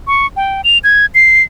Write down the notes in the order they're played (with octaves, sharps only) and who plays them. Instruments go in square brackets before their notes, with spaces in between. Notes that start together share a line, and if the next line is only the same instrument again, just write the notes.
[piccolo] C#6
G5
F7
G#6
C7